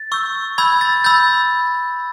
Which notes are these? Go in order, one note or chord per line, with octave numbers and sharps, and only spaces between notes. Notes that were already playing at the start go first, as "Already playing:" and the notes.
Already playing: A6
C#6 E6 G6
B5 E6 G6 G#6
A6
B5 E6 G6 A6